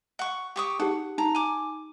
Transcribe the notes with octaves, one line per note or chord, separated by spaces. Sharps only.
F#5 C#6
G4 C#6 D#6
D#4 G4 F#5
D#4 A#5
G#5 D6